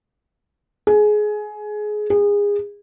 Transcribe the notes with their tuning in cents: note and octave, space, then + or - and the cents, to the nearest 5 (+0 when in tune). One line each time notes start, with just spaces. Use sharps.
G#4 +20
G#4 -25